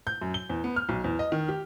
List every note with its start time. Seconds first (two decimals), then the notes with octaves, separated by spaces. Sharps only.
0.07 G6
0.22 F#2
0.34 G7
0.49 E2
0.64 B3
0.76 F6
0.89 B1
1.04 E2
1.19 D#5
1.32 D#3
1.49 G4